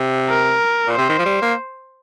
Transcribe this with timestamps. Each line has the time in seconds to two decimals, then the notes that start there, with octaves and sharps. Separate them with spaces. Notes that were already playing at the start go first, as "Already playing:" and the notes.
Already playing: C3
0.29 A#4
0.87 A#2
0.94 C3 C5
1.09 D#3
1.19 F3
1.26 G3
1.42 A#3